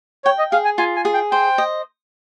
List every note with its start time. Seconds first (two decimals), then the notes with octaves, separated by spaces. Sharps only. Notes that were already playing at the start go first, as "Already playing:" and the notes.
0.25 C#5 G5
0.39 D#5
0.52 G#4 F5
0.65 G#5
0.78 F4 G#5
0.96 G#5
1.05 G#4
1.14 G5
1.32 C5 G5
1.58 D#5